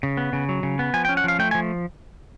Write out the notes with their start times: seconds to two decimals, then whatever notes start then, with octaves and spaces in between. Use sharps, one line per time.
0.03 C#3
0.17 B3
0.33 C#3
0.49 F#3
0.63 C#3
0.79 B3
0.94 F3 G#5
1.05 G5
1.09 C#4
1.17 F#5
1.24 F3 F5
1.39 A3 G5
1.51 G#5
1.55 F3